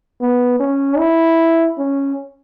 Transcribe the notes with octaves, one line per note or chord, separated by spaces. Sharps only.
B3
C#4
E4
C#4